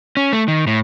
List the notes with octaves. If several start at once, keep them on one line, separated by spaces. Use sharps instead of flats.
C#4
A3
D#3
A2